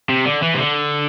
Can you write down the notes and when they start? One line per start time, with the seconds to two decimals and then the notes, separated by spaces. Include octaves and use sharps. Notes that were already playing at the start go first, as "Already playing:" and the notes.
0.09 C3
0.26 D3
0.43 E3
0.55 C3
0.60 D3